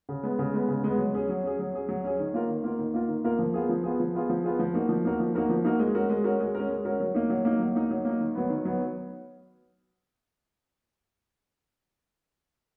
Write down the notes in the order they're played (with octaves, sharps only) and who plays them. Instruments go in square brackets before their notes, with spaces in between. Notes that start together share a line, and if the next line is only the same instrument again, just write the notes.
[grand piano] C#3
G#3 B3
C#3
G#3 B3
C#3
G#3 B3
F#3
C#4 G#4
F#3
C#4 G#4
F#3
C#4 G#4
F#3
C#4 G#4
D#3
A#3 F4 A#4
D#3
A#3 F4 A#4
D#3
A#3 F4 A#4
D#3
A#3 F4 A#4
F3
B3 F4 G#4
F3
B3 F4 G#4
F3
B3 F4 G#4
F3
B3 F4 G#4
F3
A#3 D#4 F#4 A#4
F3
A#3 D#4 F#4 A#4
F3
A#3 D#4 F#4 A#4
F3
A#3 D#4 F#4 A#4
G#3
C#4 F#4 A#4
G#3
C#4 F#4 A#4
G#3
C#4 F#4 A#4
G#3
C#4 F#4 A#4
F#3
A#3 D#4
F#3
A#3 D#4
F#3
A#3 D#4
F#3
A#3 D#4
D#3
F#3 B3
D#3
F#3 B3